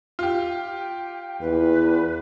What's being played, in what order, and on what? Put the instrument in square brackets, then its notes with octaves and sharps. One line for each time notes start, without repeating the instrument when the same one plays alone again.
[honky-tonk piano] F4 G4
[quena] G5
[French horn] E2 [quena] B4